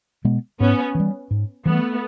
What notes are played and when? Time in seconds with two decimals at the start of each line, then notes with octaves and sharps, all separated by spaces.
0.25 B2 G#3 B3
0.60 G#2 B3 C#4
0.95 E3 G3
1.31 G#2
1.66 E3 G3 A3 B3